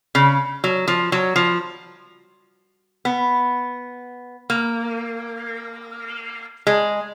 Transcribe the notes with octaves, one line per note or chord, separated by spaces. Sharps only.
C#3
F#3
F3
F#3
F3
B3
A#3
G#3